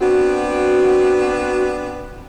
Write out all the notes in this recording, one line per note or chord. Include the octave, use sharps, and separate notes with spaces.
B3 C4 D4 F#4